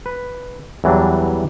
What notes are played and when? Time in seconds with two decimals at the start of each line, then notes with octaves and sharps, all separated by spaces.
0.06 B4
0.84 E2 E3 F#3 G3 D4